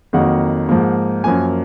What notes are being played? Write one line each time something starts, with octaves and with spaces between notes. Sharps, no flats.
F2 D#3 F#3 A#3 F#5
G#2 F3 A#3
F#2 F3 A#3 G#5